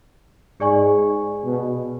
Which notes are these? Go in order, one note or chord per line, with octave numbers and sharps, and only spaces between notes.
G#2 G#4 D5 G#5 C#6
B2